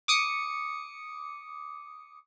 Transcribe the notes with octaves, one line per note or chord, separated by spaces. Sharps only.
D6 D#6 C#7